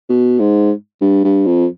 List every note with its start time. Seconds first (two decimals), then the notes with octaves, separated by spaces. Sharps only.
0.09 B2
0.39 G#2
1.01 G2
1.24 G2
1.46 F2